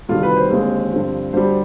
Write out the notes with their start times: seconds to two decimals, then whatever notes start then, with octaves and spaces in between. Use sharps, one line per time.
0.09 D2 C3 D#3 G3 F4
0.23 B4
0.37 C5
0.50 D#2 D3 G#3 C4
0.92 G2 D3 F3 C4
1.33 D2 D3 G3 C5